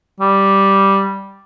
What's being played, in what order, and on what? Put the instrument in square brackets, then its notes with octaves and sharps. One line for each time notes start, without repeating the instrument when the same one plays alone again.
[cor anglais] G3